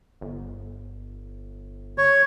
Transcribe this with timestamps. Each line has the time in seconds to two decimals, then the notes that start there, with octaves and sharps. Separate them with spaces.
0.21 G1
1.98 C#5